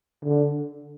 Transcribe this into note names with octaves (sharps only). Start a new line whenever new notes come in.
D3